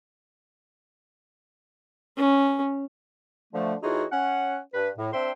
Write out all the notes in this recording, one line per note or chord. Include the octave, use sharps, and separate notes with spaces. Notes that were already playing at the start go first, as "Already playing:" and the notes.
C#4
D3 F3 A3
A2 E3 D#4 F4 F#4 G#4
C#4 F#5
G2 B4
A2
C4 D4 C5 E5 G5 C6